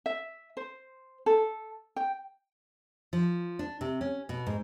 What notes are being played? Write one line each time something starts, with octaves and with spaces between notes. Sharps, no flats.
E5
C5
A4
G5
F3
D4
C3
C#4
B2
G#2